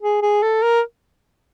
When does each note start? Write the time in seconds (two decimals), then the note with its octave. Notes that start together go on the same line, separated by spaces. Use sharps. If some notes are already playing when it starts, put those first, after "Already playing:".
0.02 G#4
0.22 G#4
0.43 A4
0.63 A#4